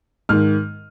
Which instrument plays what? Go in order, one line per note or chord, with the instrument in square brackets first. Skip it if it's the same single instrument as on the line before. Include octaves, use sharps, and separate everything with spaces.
[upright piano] G#2 D#3 F6